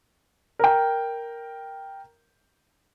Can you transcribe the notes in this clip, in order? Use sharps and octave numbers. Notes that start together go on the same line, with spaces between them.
A#4 G5